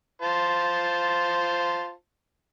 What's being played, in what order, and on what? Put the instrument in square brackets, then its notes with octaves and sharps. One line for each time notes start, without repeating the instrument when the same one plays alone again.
[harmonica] F4 C5 A5